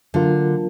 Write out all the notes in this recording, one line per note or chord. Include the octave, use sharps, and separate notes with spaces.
D3 F#3 A#3 D4 F4 A#4